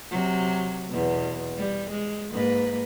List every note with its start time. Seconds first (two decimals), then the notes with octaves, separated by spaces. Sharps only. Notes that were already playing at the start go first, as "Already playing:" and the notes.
0.10 C3 F#3
0.89 E2 B2
1.56 G3
1.90 G#3
2.32 G#2 A#3 B4